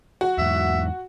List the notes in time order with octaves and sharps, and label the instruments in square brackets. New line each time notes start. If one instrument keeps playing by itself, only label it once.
[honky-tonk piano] F#4
[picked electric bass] E2 G#2 [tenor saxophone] E5